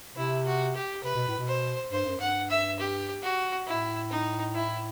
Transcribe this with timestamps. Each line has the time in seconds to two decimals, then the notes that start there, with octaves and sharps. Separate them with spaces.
0.16 C3 E4
0.46 F#4
0.75 G4
1.03 C3 B4
1.15 B2
1.28 A2
1.38 B2
1.47 C5
1.91 G2 C5
2.05 F#2
2.19 G2 F#5
2.50 E5
2.79 G4
3.23 F#4
3.67 A2 E4
4.10 D#4
4.55 E4